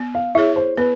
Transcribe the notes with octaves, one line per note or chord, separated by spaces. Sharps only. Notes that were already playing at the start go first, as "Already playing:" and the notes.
Already playing: B3
F5
E4 G#4 C#5 E5
C5
B3 B4